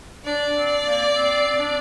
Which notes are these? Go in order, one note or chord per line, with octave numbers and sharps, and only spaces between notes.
D4 D5
C4
A#3
C4
C4
D4